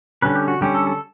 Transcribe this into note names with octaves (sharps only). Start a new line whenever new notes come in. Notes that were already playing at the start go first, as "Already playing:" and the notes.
D3 G3 C#4 B4
G4
F#4
D3 G3 C#4 G4
A4
A4